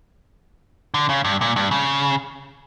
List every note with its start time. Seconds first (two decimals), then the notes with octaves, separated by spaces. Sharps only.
0.94 D3
1.09 C#3
1.25 G2
1.41 A#2
1.56 G2
1.71 C#3